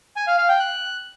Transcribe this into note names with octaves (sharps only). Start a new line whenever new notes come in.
G#5
F5
F5
G5
F#6